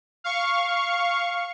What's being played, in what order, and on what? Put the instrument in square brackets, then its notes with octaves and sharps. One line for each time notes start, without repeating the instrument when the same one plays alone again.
[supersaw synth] F5 C#6